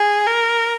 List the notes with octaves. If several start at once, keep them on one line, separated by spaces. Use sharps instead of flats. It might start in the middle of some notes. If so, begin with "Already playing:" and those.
Already playing: G#4
A#4